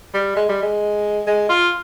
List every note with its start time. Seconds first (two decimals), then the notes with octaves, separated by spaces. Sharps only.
0.14 G3
0.36 G#3
0.49 G3
0.62 G#3
1.27 G#3
1.49 F4